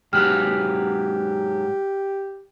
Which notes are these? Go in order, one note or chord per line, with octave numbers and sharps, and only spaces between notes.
G#2 F#3 G4 B4 F6